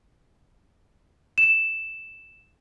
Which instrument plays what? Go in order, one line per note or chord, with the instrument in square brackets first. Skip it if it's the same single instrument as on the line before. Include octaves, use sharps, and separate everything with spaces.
[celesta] E7